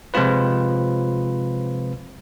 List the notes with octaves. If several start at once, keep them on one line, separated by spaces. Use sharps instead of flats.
C3 F3 G#3 C4 F4 B4